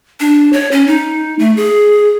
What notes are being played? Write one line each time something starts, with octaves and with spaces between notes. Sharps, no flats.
D4
C#5
C#4
D#4
A3
G#4